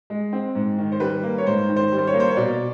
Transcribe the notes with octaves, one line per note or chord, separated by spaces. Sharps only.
G#3
C4
G#2
D#3
C5
G3 B4
A#3
C#5
G#2 C5
D#3
C5
G3
C5
C#5
A#3
C5
C#5
B2 D5